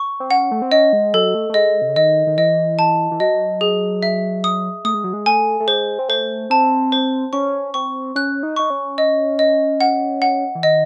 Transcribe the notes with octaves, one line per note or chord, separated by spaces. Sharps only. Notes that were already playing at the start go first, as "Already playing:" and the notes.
Already playing: C#6
C4
C#4 F#5
A3
C4
C#4 D#5
G#3
F#3 A4
A3
A3
G#3 D#5
C3
C#3
D#3 D#5
D#3
E3 D#5
A5
E3
F#3 D#5
G#4
E5
D#6
A3 D#6
G#3
F#3
G#3
A3 G#5
A3
G#3 C5
C4
A3 C5
C4 A5
C5
C#4 C#6
C4 C#6
C#4 F#6
D#4
D#4 C#6
C#4
D#5
D#5
F#5
F#5
E3
D#3 D#5